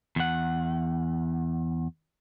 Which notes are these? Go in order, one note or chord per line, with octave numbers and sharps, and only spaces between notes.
E2 F#5